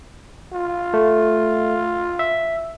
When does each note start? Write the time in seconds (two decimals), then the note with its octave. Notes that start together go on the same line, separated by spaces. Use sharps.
0.53 F4
0.94 A3
2.19 E5